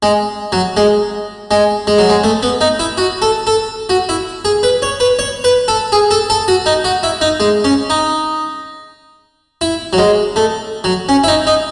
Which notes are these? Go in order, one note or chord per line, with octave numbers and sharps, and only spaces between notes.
G#3
F#3
G#3
G#3
G#3
F#3
G#3
A3
B3
D#4
E4
F#4
A4
A4
F#4
E4
G#4
B4
C#5
B4
C#5
B4
A4
G#4
A4
A4
F#4
D#4
F#4
E4
D#4
G#3
C#4
D#4
E4
F#3
G#3
A3
F#3
C#4
E4
D#4
D#4